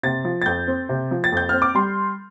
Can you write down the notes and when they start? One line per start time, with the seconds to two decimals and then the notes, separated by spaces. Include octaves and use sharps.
0.03 C3 A6
0.25 F3
0.42 A6
0.46 F2 G6
0.67 C4
0.89 C3
1.11 F3
1.24 A6
1.32 F2 G6
1.49 C4 F6
1.62 D6
1.75 G3 C6